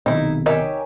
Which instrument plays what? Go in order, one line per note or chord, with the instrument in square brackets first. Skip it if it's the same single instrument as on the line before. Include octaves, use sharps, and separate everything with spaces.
[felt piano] B1 C3 D#3 [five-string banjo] D#4 E4
[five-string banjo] D#4 G4 E5 [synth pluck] A#4 C#5 G#5